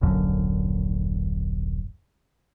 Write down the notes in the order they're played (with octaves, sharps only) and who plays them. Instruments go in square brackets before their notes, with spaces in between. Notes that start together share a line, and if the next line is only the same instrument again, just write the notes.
[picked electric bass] D#1 A#1 F#2 D3